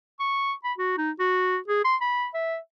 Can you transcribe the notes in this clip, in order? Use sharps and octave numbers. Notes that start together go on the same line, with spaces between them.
C#6
B5
F#4
D#4
F#4
G#4
C6
B5
E5